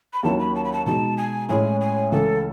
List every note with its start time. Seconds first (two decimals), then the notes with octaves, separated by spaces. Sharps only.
0.13 B5
0.23 D#2 D#3 F#3 C#4 E4 A5
0.39 B5
0.55 A5
0.64 B5
0.73 A5
0.86 B2 G#3 D#4 A5
1.17 G#5
1.49 A2 G#3 C#4 E4 G#5
1.81 G#5
2.12 C#2 C#3 E3 A3 A4